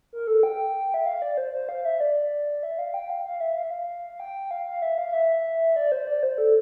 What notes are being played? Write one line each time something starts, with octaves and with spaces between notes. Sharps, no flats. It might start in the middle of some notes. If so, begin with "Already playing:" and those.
A#4
A4
G5
E5
F5
D5
C5
C5
F5
E5
D5
E5
F5
G5
F5
F5
E5
F5
E5
F5
G5
F5
F5
E5
F5
E5
D5
C5
D5
C5
A4